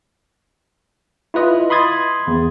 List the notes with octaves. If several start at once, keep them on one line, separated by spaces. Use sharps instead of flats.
E4 F4 B4 D#5
B5 C6 D#6 G#6 A6
E2